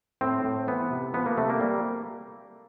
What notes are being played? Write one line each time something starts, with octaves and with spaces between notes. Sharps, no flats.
A2 C4
A2
E3 B3
C3
F3 B3
A#3
C3 A3
A#3
G3